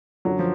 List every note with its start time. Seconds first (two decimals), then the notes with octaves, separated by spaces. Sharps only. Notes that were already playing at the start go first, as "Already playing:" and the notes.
0.25 F#2 D3 F#3
0.39 F3